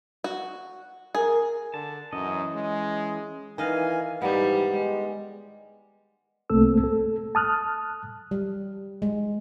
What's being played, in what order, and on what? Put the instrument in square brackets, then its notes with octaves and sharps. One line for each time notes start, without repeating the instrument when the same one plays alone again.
[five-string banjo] F#4
[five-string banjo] G#4 [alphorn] A#4
[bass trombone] D3 [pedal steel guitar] A5
[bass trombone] F#2 [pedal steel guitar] E3 C#4 D#5
[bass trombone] G#3
[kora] D#3 D#5 F5 [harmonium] E3 G#5
[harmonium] G#2 E3 [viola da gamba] G3 [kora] B3 D#4
[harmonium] G#3
[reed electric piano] C2 A3 A#3 C4 A4 E6
A4
A5 D#6 F6 F#6
[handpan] G3
G#3